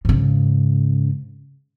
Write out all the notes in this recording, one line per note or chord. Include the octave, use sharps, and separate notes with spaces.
G#2 C#3